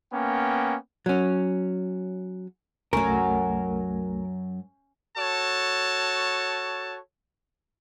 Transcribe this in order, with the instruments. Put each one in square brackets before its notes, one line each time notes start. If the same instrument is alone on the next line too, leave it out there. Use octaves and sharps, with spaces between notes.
[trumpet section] A#3 B3 C#4 G5
[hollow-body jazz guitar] F#3 C#4
[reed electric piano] C2 A3 [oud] F#2 F#3 [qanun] C#4 [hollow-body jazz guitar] A#4
[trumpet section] F#4 A4 C#5 A5